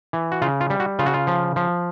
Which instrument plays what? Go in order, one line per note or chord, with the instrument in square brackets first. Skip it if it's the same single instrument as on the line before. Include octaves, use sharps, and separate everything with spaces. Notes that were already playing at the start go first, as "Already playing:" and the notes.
[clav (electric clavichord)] E3
F#4
C#3 F4
F4
G3
F#4
C#3 F4
F#4
F4
F3
F3